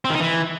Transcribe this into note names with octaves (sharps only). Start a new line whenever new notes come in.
C4
D#3
D#4
E3